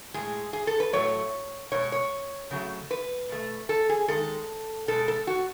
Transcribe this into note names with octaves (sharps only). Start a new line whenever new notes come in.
A2 G#3 G#4
G#4
A4
B4
A2 F#3 A3 C#5
B2 G#3 C#5
C#5
C#3 F#3 A3
B4
B2 A3
A4
G#4
D#3 G#3 A4
B2 G#3 A4
A4
F#4